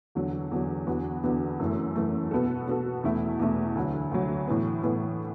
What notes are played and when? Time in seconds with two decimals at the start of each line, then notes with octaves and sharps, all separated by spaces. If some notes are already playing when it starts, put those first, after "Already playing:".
0.15 E2 D3 F#3
0.52 E2 D3 F#3
0.87 E2 D3 B3 F#4
1.23 E2 D3 B3 F#4
1.60 F#2 E3 A3
1.95 F#2 E3 A3
2.31 B2 B3 F#4 A4
2.67 B2 B3 F#4 A4
3.03 E2 B2 A3 E4
3.39 E2 B2 A3 E4
3.75 D2 D3 F#3
4.12 D2 D3 F#3
4.47 A2 E3 B3
4.83 A2 E3 B3